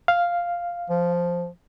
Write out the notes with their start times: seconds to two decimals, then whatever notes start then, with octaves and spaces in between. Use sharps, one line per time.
0.08 F5
0.90 F3